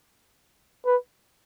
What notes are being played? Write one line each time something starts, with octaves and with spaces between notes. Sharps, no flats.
B4